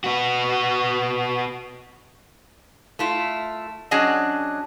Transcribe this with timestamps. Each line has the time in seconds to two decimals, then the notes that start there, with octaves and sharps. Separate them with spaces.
0.04 B3 F#4
2.99 A3 E4 F4
3.91 F#3 C#4 D4 G#4 D#5